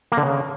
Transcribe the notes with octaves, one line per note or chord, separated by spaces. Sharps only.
A#3
D3
C#3